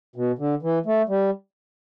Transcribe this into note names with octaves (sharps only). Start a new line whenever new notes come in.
B2
D3
E3
A3
G3